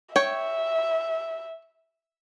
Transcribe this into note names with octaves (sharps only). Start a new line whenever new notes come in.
C#5 E5 G5